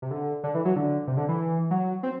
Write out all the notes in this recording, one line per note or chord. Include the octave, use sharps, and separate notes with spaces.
C3
D3
D3
E3
F#3
D3
C3
D3
E3
F#3
C4